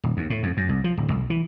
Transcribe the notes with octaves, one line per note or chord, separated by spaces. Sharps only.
D#1
D#2
A2
F2
F#2
C2
F3
D1
B1
E3